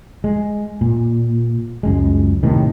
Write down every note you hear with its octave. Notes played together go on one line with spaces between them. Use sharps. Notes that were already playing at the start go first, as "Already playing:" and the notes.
G#3
A#2
C#2 F#2 G#3
D#2 A2 C3 D#3